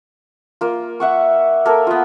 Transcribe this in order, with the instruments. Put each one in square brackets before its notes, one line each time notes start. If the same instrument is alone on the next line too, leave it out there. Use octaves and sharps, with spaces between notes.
[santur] A#3 F4
E5 F#5 C#6
A#3 A4 A#4
B3 F4